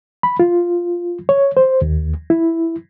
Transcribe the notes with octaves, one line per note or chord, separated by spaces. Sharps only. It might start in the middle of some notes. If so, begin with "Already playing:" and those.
B5
F4
C#5
C5
D#2
E4